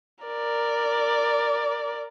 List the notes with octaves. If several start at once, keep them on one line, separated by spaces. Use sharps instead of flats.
A#4 D5